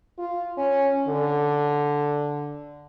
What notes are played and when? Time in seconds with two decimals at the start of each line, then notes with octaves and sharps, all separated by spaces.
0.18 F4
0.58 C#4
1.08 D3